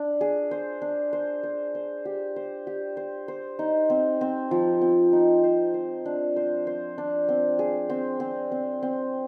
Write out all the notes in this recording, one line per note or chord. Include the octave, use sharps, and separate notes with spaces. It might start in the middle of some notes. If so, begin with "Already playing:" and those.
Already playing: D4
G#4
C5
D4
C5
C5
C5
G4
C5
G4
C5
C5
D#4
C4
C4
F3
C4
D#4
C5
C5
D4
C5
C5
D4
C4
G#4
C4
C4
C4
C4